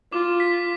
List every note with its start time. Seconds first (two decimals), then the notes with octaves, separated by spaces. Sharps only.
0.12 F4 D6
0.40 B6